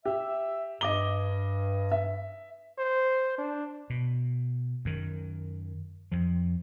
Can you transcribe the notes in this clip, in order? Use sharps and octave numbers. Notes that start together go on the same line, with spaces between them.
G4 E5
G2 D#5 D6 G7
E5
C5
D4
B2
F#2 D#3
F2 F3